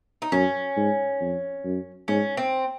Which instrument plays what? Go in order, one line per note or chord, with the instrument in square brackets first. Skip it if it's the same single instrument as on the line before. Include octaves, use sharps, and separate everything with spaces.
[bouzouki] D#4
[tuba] F#2 [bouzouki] C#4
[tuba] G#2
F2
F#2
[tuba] G#2 [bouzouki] C#4
[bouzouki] C4